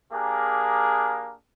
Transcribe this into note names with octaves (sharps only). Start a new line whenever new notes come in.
A#3 D4 G4 G#4 A#4